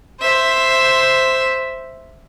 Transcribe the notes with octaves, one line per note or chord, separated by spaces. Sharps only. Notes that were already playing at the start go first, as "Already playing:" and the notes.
C5 E5